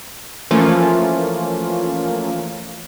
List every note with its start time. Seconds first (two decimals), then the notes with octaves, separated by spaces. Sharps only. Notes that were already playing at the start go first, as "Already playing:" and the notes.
0.51 E3 F3 A3 A#3 C#4 F4